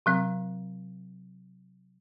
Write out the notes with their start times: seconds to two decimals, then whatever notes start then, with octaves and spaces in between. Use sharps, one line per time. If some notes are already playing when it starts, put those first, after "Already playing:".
0.06 C3 F#3 C4